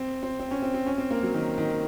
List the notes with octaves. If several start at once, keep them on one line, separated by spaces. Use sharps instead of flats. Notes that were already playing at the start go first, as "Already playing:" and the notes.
Already playing: C4
C4
C4
C#4
C4
C4
C#4
C4
A#3
F#3
D#3
D#3